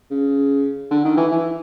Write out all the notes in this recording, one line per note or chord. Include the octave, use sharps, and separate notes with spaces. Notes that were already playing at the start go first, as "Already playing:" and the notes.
C#3
D3
D#3
E3
E3